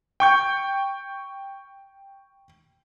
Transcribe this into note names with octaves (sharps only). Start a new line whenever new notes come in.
G5 C#6 G6